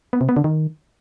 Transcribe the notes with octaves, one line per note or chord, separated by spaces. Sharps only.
B3
C3
B3
D3
D#3